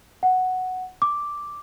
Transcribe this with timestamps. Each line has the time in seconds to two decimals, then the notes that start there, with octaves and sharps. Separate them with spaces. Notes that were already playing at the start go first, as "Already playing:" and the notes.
0.23 F#5
1.02 D6